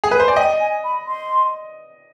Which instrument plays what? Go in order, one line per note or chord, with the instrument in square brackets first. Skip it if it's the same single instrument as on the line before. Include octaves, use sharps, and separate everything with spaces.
[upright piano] G#4
B4
C5
[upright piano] D5 [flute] G#5
[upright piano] D#5 [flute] G5
[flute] G#5
B5
C6